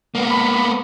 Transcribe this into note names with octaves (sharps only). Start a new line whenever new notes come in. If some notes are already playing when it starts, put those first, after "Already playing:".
A#3 B3
B5